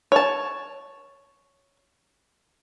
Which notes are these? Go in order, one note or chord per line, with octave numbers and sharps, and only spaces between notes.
C#5 A5